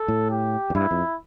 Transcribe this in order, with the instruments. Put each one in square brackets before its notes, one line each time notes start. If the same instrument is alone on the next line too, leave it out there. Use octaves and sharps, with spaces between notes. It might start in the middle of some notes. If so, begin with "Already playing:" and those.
Already playing: [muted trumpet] A4
[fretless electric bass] A2
[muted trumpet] G4
[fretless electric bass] F2
[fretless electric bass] G2 [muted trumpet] E4
[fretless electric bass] F2